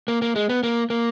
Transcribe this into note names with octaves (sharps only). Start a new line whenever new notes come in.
A#3
A#3
G#3
B3
A#3
A#3